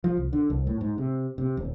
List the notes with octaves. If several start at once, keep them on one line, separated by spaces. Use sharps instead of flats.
F3
C2
D3
C2
A2
G#2
C3
C3
D#1